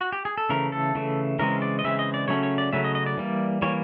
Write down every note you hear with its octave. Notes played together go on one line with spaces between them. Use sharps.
F#4
G4
G#4
A4
C#3 E3 A3 A#4
A4
C#3 E3 A3
C#3 E3 G#3 C4 A#4
D5
D#5
C#3 E3 G#3 C4 E5
D#5
D5
C#3 F#3 A3 C#4 C#5
C#5
D5
C#3 F#3 A3 C#4 E5
D#5
D#5
D5
E3 G3 A#3
E3 G3 A#3 C#5